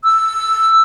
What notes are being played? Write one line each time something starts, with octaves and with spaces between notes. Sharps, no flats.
E6